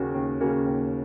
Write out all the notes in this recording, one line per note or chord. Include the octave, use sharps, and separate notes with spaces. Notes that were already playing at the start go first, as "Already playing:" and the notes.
Already playing: D#2 C#3 A#3 C#4 F#4
D#2
C#3 A#3 C#4 F#4
D#2